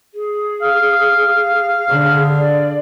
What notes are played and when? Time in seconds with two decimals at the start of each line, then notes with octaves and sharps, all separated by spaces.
0.14 G#4
0.62 F5
1.89 D3 G#4
2.38 D5